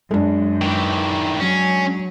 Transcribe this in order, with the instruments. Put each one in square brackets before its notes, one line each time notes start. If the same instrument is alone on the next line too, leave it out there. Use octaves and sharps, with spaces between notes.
[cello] F#2 [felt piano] G#3 D4
[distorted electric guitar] D#3 E3
[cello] F#3 [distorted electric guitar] C#4